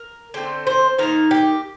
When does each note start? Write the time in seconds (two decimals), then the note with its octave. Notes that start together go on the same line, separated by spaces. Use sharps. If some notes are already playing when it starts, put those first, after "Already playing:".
Already playing: A#4
0.34 D3 A3 C4 C5
0.67 C5
0.99 D#3 A#3 D#4 A#4
1.31 G4